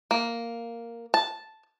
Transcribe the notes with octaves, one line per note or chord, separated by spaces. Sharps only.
A#3
A5